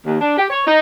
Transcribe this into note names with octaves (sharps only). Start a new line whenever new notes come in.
D#2
D4
G4
C#5
D#4